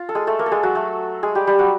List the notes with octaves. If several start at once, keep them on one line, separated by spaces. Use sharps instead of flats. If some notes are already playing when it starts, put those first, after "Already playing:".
Already playing: F4
A4
G#3 G#4
A3 A4
A#3 A#4
A4
G#3 G#4
F#3 F#4
A3 A4
G#3 G#4
G3 G4
G3 G4
F#3 F#4